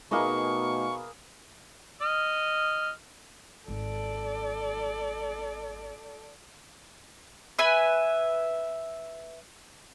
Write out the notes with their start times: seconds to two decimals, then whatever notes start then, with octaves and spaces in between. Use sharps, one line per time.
0.11 B2 A3 A#3 D#4 G#4 B4 D#5 C#6
2.01 D#5 F6
3.68 G#1 A4 D5
7.59 B4 E5 G#5